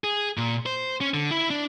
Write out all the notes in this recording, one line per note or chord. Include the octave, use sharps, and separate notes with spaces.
G#4
A#2
C5
C#4
D3
E4
D4